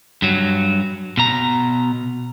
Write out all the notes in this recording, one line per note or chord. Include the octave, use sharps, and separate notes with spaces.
G2 F#3
B2 A#5